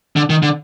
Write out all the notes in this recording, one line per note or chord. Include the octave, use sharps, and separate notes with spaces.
D3
D#3
D3